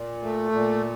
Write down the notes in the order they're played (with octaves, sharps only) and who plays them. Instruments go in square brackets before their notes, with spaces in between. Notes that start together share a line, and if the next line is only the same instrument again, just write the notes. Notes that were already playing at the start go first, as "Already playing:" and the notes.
Already playing: [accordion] A#2
A3
A#2